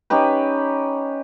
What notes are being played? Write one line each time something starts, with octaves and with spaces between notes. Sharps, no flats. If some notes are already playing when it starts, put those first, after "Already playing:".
C#4 D#4 G4 B4